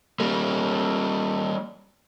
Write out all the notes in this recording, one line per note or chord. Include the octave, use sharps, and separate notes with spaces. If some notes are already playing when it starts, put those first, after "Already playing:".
G3 A#3